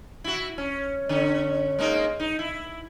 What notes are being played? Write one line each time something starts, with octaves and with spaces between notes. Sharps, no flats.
E4 F#4
C#4
D3 C#4
G#3 A#3 D#4
D#4
E4